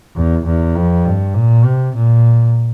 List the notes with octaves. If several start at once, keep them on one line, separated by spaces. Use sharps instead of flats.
E2
E2
F2
G2
A#2
C3
A#2